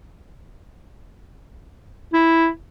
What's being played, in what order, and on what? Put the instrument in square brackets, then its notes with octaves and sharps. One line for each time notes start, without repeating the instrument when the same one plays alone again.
[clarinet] E4